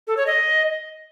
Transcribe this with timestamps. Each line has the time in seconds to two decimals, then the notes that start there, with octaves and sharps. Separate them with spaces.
0.07 A4
0.17 C#5
0.27 D#5